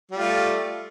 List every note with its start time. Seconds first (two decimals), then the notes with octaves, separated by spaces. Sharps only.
0.11 G3
0.15 F4
0.19 A3